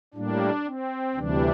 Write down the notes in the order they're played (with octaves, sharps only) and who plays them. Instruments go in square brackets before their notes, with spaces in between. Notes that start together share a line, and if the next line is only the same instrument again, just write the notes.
[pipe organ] A2 G3 A#3 D4
C4
D2 C3 E3 G3 D4